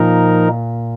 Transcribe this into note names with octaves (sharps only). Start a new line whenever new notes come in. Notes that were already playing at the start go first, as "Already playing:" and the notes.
Already playing: A#2 F3 D#4 A#4